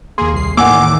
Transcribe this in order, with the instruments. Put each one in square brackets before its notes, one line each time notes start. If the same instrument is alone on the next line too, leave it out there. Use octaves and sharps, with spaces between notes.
[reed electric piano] D#2 C6 [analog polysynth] A#3 G#4
[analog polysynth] C2 C7
[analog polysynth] E2 A2 D#3 [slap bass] A#3 [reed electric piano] F#5 G#5 E6 [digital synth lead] D6